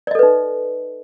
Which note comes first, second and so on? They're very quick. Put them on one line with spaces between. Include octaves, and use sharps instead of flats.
D5 D#5 A4 B4 D#4